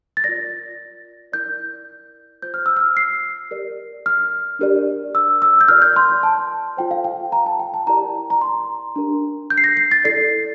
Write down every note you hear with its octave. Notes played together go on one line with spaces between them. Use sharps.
A6
F4 A#4 D5 A#6
E4 A#4 D5 G6
F4 C5 G6
F6
E6
F6
C7
G4 A#4 D5
F6
D4 G4 A#4 D5
E6
E6
G6
F4 A#4 D5 F6
G6
C6
A5
F4 A4 C5 G5
F5
G5
A#5
A5
G5
A5
E4 G4 A#4 D5 A#5
A#5
C6
D4 G4 A#4
G6
C7
A#6
C7
A6
E4 A4 D5 C7